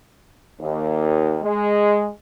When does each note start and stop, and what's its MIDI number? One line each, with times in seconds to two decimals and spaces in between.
0.60 1.37 39
1.42 2.07 56